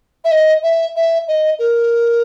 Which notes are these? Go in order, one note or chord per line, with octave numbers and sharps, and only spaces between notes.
E5
D#5
E5
E5
D#5
A#4